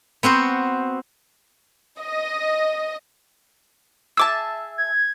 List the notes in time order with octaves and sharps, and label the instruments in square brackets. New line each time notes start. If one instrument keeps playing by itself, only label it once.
[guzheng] B3 C4 F#4 C5
[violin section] D#5
[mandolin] G#4 E5 A5 [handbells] D6 E6
[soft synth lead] G#6